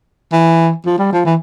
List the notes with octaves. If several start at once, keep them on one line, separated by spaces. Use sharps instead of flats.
E3
F3
G3
F3
E3